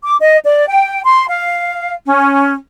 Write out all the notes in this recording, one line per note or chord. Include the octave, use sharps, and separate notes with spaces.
D6
D#5
D5
G5
C6
F5
C#4